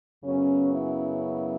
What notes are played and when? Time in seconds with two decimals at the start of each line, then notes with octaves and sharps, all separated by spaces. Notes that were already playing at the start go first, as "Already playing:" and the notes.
0.24 F#2 C#3 F#3 B3 C#4
0.71 E4